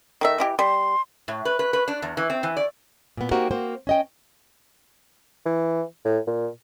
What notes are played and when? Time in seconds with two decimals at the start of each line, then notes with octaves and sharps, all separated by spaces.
0.21 D#3 A3 D#5 E5
0.38 E3 E4 G4
0.59 G3 C6
1.28 A2
1.45 B4
1.59 B4
1.73 B4
1.88 D4
2.02 E2
2.17 E3
2.30 C4
2.43 E3
2.57 D5
3.17 A#2 B3
3.31 A#3 C4 D#4 F#4 G4 A#4
3.51 A#3 C4 F#4 C5
3.87 C#4 D#5 G5
5.46 E3
6.05 A2
6.27 A#2